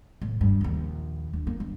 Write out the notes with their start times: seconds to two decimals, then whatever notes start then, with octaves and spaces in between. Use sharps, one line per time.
0.22 A2
0.41 G2
0.61 A#1 D#2
1.33 D2
1.47 A#3
1.60 G2